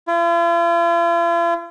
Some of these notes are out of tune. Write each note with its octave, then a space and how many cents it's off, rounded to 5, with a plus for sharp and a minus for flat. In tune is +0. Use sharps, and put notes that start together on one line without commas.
F4 -45